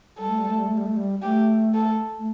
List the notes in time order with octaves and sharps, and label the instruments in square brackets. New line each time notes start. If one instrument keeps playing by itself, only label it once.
[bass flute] G3 [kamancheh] A4
[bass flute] A3
G3
A3
G3
A3
G3
A3
G3
[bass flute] A3 [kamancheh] G4
[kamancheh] A4
[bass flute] A3